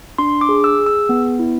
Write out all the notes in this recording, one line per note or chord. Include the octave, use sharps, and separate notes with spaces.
D4 C6
D6
G#4
E6
G#4
E6
B3
E4